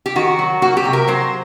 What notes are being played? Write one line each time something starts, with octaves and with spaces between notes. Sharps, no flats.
G4
D#3 F#4
F#3
A#3 F#4
G4
C3
A#4
F#3 C5